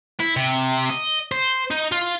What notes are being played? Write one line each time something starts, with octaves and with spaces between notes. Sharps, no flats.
E4
C3
D#5
C5
D#4
F4